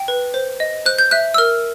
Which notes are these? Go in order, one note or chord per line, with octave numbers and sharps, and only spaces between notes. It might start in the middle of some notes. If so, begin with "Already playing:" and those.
Already playing: G5
B4
C5
D#5
C5 F#6
G6
E5 F#6
E6
A#4 F6